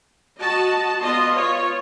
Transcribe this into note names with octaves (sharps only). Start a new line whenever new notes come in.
F#4 D#5 A5
B3 F4 D#5 C6
F4 C#5